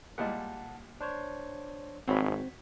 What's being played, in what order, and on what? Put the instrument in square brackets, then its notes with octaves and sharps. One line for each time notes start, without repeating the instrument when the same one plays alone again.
[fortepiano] A#2 G3 G#3 [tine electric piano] F#5 A5
[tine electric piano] D4 C5 C#5
[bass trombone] G#1 [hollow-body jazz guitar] C4 [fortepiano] F#4 C#5 B5